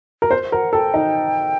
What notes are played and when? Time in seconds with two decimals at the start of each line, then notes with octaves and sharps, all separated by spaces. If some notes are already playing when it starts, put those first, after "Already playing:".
0.22 A#4
0.31 C5
0.52 A#4 F#5
0.73 A4 G5
0.94 D#4